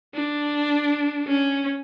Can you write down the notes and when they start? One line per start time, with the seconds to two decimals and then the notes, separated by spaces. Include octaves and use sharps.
0.15 D4
1.27 C#4